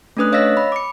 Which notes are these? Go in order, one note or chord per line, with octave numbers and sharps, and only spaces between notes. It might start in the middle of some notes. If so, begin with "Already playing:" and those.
A3 C#4 D4 B4 D#6 F#6
C#5 D#5 F5 E6 A#6 B6
B5
D6 C#7